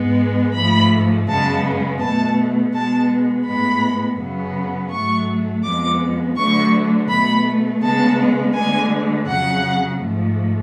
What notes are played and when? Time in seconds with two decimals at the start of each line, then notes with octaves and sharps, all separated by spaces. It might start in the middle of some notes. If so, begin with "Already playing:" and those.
Already playing: G#2 G#3 B3
0.54 G#2 F3 A3 B5
1.28 F#2 C#3 G#3 B3 A5
2.00 B2 A3 A5
2.72 B2 G#3 B3 A5
3.46 A2 G#3 B3 B5
4.19 F#2 C#3 F#3 B3
4.90 G#2 F#3 A3 C#6
5.63 F2 F3 G#3 B3 D6
6.37 D2 D3 F#3 A3 C#6
7.09 B2 A3 B5
7.81 D2 C#3 G#3 B3 A5
8.54 D2 D3 G#3 G#5
9.27 F2 C#3 F#3 F#5
10.01 G#2 F3 A3